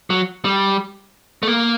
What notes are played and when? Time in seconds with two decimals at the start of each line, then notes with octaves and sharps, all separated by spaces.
0.10 F#3
0.45 G3
1.43 A3
1.48 A#3